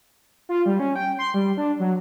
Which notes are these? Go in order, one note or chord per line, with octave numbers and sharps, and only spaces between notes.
F4
G3
C#4
G5
C6
G3
D4
F#3